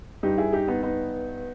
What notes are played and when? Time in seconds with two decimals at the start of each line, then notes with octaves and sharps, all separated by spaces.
0.23 G2 G3 D#4 G4
0.38 E4 G#4
0.53 D#4 G4
0.68 B3 D#4
0.83 B3 D#4